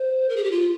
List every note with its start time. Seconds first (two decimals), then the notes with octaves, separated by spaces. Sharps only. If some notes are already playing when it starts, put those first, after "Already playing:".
Already playing: C5
0.29 A#4
0.36 G#4
0.44 G4
0.51 F4